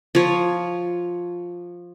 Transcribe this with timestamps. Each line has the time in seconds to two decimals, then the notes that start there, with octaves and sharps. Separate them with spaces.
0.15 F3 C#5